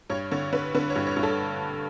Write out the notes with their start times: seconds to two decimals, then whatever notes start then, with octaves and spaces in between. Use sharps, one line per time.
0.10 G2 C#5
0.31 D3 C#5
0.53 D3 B4
0.75 D3 B4
0.90 C#5
0.96 G2
1.07 C#5
1.17 G2
1.23 A4